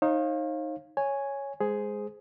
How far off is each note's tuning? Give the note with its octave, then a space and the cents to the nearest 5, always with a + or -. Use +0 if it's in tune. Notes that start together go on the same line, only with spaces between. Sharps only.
D#4 +0 C#5 -45 F5 +0
C#5 +0 G#5 +0
G#3 -10 G#4 +5 C5 -5